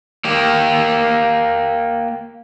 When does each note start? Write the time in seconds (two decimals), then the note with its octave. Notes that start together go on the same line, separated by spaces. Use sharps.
0.25 A#3 G4